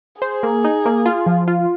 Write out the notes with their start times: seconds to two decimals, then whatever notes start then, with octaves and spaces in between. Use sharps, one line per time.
0.22 G#4 C5
0.43 A#3
0.64 D#4
0.86 A#3
1.06 F4
1.26 F3
1.48 F4